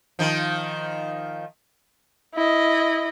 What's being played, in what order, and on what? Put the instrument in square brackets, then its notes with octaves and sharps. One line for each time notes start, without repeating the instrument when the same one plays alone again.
[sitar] D#3 F3
[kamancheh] E4 D#5